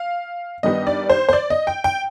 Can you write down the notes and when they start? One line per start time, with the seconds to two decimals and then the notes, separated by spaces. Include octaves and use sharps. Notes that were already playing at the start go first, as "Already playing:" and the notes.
Already playing: F5
0.63 G2 D#3 G3 B3 D#4 D#5
0.87 D5
1.10 C5
1.29 C5
1.33 D5
1.50 D#5
1.67 G5
1.84 G5